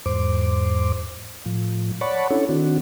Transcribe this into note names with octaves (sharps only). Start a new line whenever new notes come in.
E2 G#2 C5 D6
A2 F3
C#5 D5 F#5 A5 B5 C#6
C#4 D4 E4 A4 C#5
D#3 C4 D4 F#4